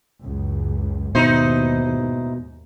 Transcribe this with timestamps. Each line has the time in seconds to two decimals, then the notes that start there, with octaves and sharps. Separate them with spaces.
0.21 C#2 F#2
1.15 D#2 G#2 B2 D#4 E4 C5